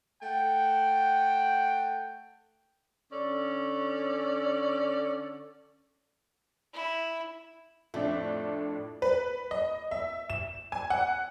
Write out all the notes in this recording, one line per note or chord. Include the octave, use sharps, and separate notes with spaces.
A3 F#5 G5
D3 C#4 A4 D5
E4
F2 A2 A3 D4
B4
D#5
E5
E7
G#5
F#5